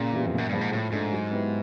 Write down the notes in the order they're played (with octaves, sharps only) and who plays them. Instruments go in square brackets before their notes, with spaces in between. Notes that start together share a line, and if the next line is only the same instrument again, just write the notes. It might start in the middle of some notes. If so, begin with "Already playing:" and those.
Already playing: [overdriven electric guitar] A#2 [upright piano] C#3
[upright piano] E3 G3 B3
[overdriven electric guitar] F2
[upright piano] A#2
[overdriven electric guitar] F#2
[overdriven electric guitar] G2 [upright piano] F3 G#3
[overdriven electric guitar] G#2
[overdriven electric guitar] A2 [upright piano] F3
[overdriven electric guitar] G#2 [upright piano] A3 D4
[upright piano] F#3
B3 E4 G4